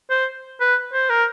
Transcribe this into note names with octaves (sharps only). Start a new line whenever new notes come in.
C5
B4
C5
A#4